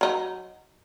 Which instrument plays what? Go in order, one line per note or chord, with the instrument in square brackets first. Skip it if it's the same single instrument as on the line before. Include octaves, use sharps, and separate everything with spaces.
[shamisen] F#3 D#4